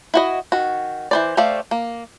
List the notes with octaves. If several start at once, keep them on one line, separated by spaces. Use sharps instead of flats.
E4 F#4 D#5
D#3 F#4
E3 C5 D5
A3 G4 C5 D5 F5
A#3